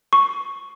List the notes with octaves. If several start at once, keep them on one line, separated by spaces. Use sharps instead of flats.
C#6